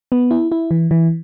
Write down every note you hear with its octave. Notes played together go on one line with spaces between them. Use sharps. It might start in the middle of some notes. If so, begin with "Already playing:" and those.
B3
E4
E4
E3
E3